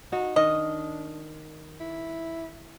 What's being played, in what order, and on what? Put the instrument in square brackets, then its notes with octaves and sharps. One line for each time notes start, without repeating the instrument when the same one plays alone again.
[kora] D#4 [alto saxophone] F#4
[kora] D#3 [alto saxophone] D4 [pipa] D#5
[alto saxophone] E4